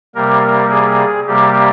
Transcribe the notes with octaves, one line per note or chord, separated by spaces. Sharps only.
C3 G3 A#3 A#4
G#4
C3 G3 A#3 G4